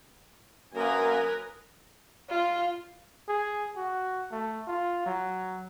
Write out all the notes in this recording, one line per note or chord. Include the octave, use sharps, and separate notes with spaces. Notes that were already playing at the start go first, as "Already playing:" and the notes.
F#2 A#3 A#4 B4 G#5 D#6
F4
G#4
F#4
A3
F4
F#3